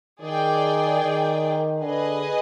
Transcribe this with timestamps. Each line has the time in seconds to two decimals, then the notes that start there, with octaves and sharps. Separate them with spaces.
0.21 D#3 G#4 D5 G5
1.01 D#3
1.82 D3 G#4 B4 D#5 G#5